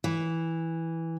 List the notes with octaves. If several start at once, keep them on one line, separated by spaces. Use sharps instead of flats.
E3